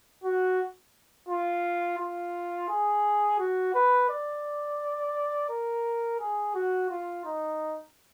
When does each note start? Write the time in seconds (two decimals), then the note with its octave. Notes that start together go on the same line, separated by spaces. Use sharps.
0.24 F#4
1.29 F4
1.99 F4
2.69 G#4
3.39 F#4
3.75 B4
4.09 D5
5.49 A#4
6.20 G#4
6.55 F#4
6.90 F4
7.25 D#4